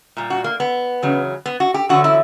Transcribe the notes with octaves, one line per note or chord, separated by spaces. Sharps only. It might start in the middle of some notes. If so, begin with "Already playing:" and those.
A#2 G3
F#4
A#3
B3
E2 C#3 F#3
B3
F#4
G4
E2 D3 F#3 F#4
E4